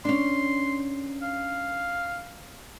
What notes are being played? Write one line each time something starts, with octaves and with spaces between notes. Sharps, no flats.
C#4 D4 C6
F5